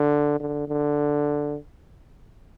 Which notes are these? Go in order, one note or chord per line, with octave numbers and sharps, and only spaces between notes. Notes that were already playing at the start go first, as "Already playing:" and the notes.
Already playing: D3
D3
D3